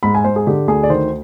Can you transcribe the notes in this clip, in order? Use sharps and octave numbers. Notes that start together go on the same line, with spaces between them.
G#2 B5
G#5
G#2 C5
G#4
D3 G4
D2 G#4
D5
D#3 C5